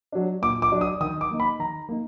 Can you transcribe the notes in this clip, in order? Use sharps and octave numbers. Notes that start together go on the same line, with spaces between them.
F#3 D4
A#2 D6
D6
F#3 D4
D#6
D#3 D#6
D6
A#3 D#4
B5
D#3 A#5
A#3 D#4